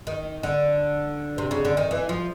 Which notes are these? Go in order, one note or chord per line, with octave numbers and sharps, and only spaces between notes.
D#3
D3
C3
C#3
D3
D#3
E3
F3